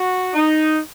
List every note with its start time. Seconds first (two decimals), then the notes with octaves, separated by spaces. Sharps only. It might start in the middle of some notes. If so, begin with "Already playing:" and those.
Already playing: F#4
0.34 D#4